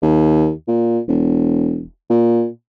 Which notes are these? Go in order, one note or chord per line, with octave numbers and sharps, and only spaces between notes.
D#2
A#2
E1
A#2